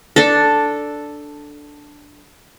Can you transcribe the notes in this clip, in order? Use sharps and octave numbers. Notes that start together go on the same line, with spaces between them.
D4 A4